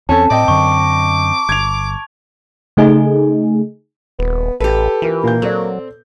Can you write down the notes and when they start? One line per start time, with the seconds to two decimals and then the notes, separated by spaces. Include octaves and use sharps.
0.09 E2 C4 C#4 A4 C#5 A5
0.31 A2 C4 D#5 G5 D6
0.48 F#2 D3 C#6
1.49 G1 G#6 F7
2.77 C#3 A3 D#4 G#4
4.19 D#1 B3
4.60 A1 G4 A4 B4
5.02 E3 F4 A#4
5.23 A#2 A#3 G6
5.42 F#3 C4 A4 D5